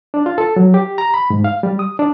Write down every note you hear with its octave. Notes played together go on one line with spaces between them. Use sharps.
D4
F4
A4
F#3
G4
A#5
B5
G#2
F5
G3
D#6
D4